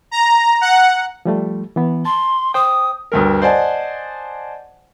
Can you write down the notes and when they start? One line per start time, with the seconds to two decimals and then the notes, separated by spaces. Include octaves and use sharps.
0.11 A#5
0.61 F#5
1.25 F3 G3 A3
1.76 E3 B3
2.05 A5 C6
2.54 C5 G5 D#6
3.12 D2 G2 A#4
3.42 C5 D5 D#5 F#5 G#5 A5